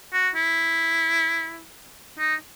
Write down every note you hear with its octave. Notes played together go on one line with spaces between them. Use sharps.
F#4
E4
D#4